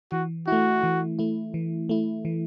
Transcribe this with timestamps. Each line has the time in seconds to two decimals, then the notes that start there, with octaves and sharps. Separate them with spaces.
0.12 E3 F#4
0.47 A3 E4 F#4
0.83 E3
1.19 A3 E4
1.54 E3
1.89 A3 E4
2.25 E3